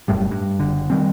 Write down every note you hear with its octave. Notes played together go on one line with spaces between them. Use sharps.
E1 F#2 A2 G3
G2
F#1 D3
D#3 G3 C4